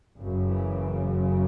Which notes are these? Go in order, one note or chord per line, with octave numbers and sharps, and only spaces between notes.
F#1 F#2 C#3
E3